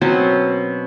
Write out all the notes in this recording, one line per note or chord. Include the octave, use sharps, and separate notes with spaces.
B2 F#3 C4 C#4